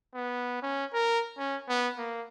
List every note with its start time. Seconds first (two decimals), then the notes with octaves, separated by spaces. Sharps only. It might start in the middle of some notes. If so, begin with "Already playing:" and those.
0.15 B3
0.62 C#4
0.94 A#4
1.38 C#4
1.69 B3
1.98 A#3